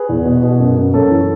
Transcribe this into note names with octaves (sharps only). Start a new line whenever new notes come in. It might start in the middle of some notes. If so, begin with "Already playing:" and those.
Already playing: G#4 B4
E2
B2
B2
F#2
F#2
F#2 A4 C#5
E3